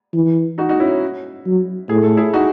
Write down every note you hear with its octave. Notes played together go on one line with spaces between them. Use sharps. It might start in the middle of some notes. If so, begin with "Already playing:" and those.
E3
D#4 F#4
D#4 F#4
C#4 E4
F#3
A2 G#4
A4
E4 G#4
D#4 F#4